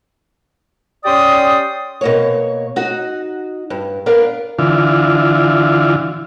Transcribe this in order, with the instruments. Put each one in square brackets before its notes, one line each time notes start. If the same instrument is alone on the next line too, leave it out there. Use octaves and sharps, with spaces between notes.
[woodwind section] C#4 G4 D5 G5 C6 D#6
[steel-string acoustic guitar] B2 A#3 C#5
D#4 F#4 F#5
G2
B3 D4 A#4 F5
[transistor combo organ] D3 E3 F4